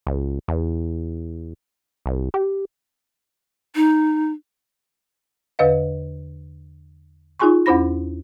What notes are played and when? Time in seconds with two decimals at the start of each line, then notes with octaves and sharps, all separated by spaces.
0.07 C#2
0.48 E2
2.06 C2
2.34 G4
3.76 D#4
5.59 E2 D3 B4 D#5 F5
7.39 D#4 F4 G#4 G#5 C6 C#6
7.66 E2 C#4 E4 C5 B5 A#6